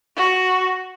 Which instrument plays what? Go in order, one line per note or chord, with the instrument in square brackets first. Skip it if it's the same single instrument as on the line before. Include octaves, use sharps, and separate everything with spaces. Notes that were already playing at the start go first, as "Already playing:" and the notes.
[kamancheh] F#4